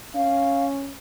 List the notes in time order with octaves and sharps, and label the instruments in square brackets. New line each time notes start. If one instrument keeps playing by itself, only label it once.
[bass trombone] C#4 [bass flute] F5